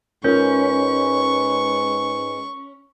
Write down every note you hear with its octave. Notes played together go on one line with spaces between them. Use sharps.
G#2 G#3 C#4 F4 A#4 B4 C#6 G6